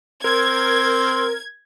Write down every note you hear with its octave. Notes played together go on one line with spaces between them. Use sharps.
C4 A#4 G#6